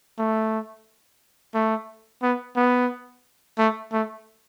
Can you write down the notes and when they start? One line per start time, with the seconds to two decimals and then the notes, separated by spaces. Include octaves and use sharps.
0.19 A3
1.55 A3
2.23 B3
2.57 B3
3.58 A3
3.92 A3